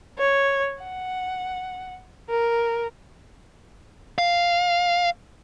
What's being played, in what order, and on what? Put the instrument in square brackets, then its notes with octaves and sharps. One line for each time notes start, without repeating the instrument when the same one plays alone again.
[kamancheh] C#5
F#5
A#4
[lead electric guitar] F5